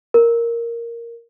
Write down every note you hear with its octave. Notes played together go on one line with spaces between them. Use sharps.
A#4